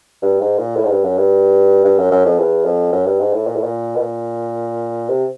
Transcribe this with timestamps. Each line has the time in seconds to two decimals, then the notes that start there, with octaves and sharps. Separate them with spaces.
0.22 G2
0.41 G#2
0.58 A#2
0.76 A2
0.85 G#2
0.91 G2
1.04 F#2
1.18 G2
1.84 G2
1.98 F#2
2.11 F#2
2.25 F2
2.39 E2
2.65 F2
2.92 F#2
3.06 G2
3.20 G#2
3.33 A2
3.47 A#2
3.56 A2
3.64 A#2
3.95 B2
4.00 A#2
5.09 C3